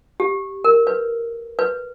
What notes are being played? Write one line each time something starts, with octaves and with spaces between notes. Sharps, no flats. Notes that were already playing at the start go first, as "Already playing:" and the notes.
G4
A#4
B4
B4